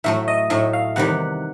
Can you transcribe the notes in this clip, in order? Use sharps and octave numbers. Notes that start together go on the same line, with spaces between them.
A2 F#3 A3 E5
D#5
A2 F#3 A3 E5
F5
E2 C3 D#3 G3 F#5